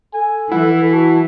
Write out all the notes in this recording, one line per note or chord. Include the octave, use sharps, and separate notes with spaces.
A4 G#5
E3 E4 F#5
F#4 A5